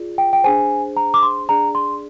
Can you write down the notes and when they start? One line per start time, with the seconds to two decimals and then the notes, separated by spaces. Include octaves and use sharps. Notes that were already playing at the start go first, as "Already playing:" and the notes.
Already playing: F4 G#4 D5
0.18 G5
0.33 G5
0.44 D4 G#4 C5 G#5
0.97 A#5
1.14 D6
1.23 C6
1.49 D4 G#4 D5 A#5
1.75 C6